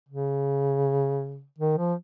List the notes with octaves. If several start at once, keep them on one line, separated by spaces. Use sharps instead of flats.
C#3
D#3
F3